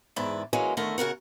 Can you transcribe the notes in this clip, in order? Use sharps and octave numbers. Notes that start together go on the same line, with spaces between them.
E2 G#2 E4 B4 D5
E3 F#3 G#3 A#3 C#4
D3 D#3 A3 A#4
C#3 F#4 A#4 F#5